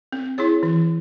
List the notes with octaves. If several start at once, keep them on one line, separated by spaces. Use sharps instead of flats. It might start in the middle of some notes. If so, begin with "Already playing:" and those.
C4
E4 G#4 C#5
E3